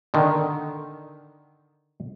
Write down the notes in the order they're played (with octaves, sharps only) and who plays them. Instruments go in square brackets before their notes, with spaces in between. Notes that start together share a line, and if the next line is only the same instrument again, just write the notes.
[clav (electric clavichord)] D3 D#3